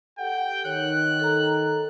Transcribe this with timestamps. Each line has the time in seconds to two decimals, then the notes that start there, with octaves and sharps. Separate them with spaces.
0.18 G4 A4 F#5 G5
0.65 D#3 C#5 F#6
1.20 A4 A#5